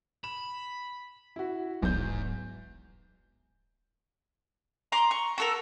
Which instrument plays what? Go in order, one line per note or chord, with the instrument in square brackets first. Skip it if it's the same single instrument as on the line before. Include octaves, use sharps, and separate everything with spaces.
[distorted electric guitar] B5 [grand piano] E7
[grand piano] E4 F#4
[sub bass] D1 [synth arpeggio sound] B1 [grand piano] E2 G6 [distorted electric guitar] G#2
[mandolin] A#5 C6 D6
C#6
F#4 A4 A#4